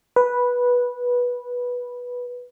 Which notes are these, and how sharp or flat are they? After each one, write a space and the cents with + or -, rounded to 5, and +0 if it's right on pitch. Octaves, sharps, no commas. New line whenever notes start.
B4 -10